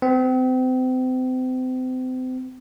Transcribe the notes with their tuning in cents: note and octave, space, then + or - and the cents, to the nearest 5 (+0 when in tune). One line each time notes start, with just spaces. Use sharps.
C4 -35